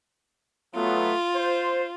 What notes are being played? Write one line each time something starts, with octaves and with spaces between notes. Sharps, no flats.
F#3 A3 B3 F4
C5